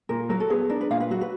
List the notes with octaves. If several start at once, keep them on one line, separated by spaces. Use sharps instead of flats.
A#2 A#4
F#3 A#4
A4
B3 G#4
D4 A#4
B4
A#2 F5
B4
F#3 F#4
B4